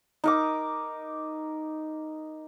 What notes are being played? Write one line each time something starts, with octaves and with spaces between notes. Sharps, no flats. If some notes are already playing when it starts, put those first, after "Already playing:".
D#4 A#4 D6